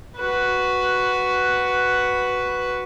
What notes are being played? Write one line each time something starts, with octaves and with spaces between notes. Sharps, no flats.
F#4 B4